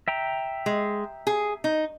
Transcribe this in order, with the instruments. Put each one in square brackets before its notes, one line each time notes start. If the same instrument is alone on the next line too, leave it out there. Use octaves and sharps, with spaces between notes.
[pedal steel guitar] E5 G5 A#5
[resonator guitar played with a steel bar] G#3
G#4
D#4